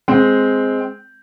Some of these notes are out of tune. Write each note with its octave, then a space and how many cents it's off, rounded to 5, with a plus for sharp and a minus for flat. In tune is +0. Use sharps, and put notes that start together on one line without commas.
G#3 +0 C4 -5